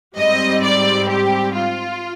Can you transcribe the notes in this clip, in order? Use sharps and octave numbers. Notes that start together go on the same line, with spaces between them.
G#2 G3 C4 D#5
D5
G4
F4